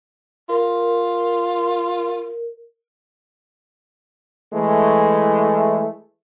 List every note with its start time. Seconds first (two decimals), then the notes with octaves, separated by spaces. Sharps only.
0.49 F4 A#4
4.53 E3 G#3 A3